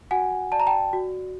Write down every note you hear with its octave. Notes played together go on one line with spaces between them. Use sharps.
F#4 F#5 G#5
D5 A5
A#5
G5 A5
F#4